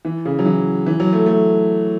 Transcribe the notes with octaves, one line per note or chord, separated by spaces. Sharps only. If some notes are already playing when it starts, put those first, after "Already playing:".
E3
C#3
F#3
E3
E3
F#3
A3
A3